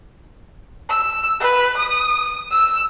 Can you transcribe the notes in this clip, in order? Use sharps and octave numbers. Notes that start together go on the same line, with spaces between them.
E6
B4
D#6
E6